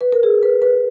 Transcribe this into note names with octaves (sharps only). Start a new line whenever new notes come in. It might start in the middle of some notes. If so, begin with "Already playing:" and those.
B4
A#4
G#4
B4
B4